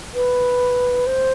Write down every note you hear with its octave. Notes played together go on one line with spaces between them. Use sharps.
B4
C5